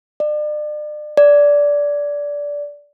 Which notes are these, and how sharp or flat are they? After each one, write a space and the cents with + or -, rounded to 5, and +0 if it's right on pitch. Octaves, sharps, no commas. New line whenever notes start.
D5 +40
D5 -15